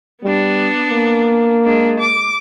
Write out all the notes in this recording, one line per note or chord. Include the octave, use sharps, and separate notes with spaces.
G3 B3 D4
A#3
G#3 D4
D6